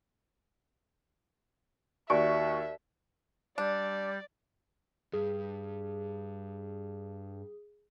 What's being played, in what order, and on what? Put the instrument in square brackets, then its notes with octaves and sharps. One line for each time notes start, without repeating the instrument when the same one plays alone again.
[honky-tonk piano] D#2 F#4 C#6 [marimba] D5 [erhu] E5
[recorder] G3 [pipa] D4 [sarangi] D5
[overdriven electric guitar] G2 [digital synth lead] G#4